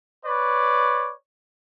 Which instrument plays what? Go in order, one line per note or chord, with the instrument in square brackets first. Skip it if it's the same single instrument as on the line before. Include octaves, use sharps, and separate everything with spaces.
[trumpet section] B4 C#5 D5